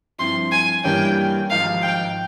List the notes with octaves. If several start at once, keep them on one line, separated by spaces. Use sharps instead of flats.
G2 F3 C4 E4 C6
G#5
G2 E3 G3 A#3 C#4 G5
G#1 G#2 F3 F5
G5